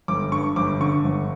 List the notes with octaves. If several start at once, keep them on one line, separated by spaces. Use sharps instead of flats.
G1 D6
G2 C#6
G1 D6
D3 C#6
G1